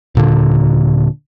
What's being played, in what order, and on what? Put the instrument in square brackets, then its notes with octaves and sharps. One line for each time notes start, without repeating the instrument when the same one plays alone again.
[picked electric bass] D#1 A#2 D3